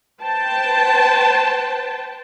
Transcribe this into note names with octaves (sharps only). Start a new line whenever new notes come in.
B4 C5 G5 A5